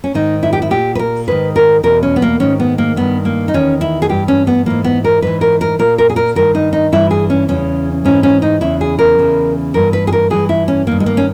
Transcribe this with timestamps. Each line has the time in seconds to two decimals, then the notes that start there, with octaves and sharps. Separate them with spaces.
0.04 C#4
0.14 G#2 D#3 D#4
0.43 E4
0.53 G4
0.62 E4
0.70 A#2 G4
0.95 B4
0.99 A#4
1.27 G#2 D#3 B4
1.56 A#4
1.83 E2 B2 A#4
2.03 C#4
2.16 B3
2.22 A#3
2.40 G#2 D#3 C#4
2.60 B3
2.78 A#3
2.96 G2 D#3 B3
3.25 A#3
3.48 D#4
3.54 E2 D#3 C#4
3.81 E4
4.02 G#4
4.09 G2 E3 G4
4.28 C#4
4.47 B3
4.66 G#2 E3 A#3
4.84 B3
5.04 A#4
5.22 G#2 E3 B4
5.41 A#4
5.61 A#4
5.79 A#2 A#4
5.98 A#4
6.09 G#4
6.16 A#4
6.35 G2 D#3 A#4
6.55 D#4
6.73 D#4
6.92 G2 E3 E4
7.11 G#4
7.30 C#4
7.48 E2 C#3 E3 C#4
8.05 G#2 E3 C#4
8.23 C#4
8.42 D#4
8.61 E2 C#3 E3 E4
8.81 G#4
8.99 A#4
9.18 E2 C#3 E3
9.74 G2 E3 A#4
9.93 B4
10.07 G#4
10.12 A#4
10.30 G2 E3 G#4
10.49 E4
10.68 C#4
10.87 G2 D#3 A#3
11.00 G#3
11.06 A#3
11.17 C#4